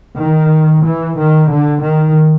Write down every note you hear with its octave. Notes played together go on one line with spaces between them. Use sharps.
D#3
E3
D#3
D3
D#3